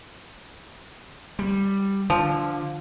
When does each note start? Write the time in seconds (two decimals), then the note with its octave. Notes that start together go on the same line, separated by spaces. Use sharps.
1.39 G3
2.10 D3 F3